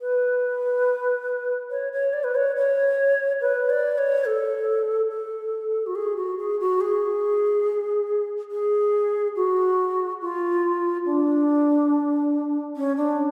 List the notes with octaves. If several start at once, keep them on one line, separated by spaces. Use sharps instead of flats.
B4
C#5
C#5
D5
B4
C#5
C#5
B4
D5
C#5
A4
A4
F#4
G#4
F#4
G#4
F#4
G#4
G#4
F#4
F4
D4
C#4
D4